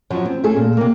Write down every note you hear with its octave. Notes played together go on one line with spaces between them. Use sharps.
F#2 F3 F#3
C4
A3 C#4 G#4 A4
A#2
C3 A#3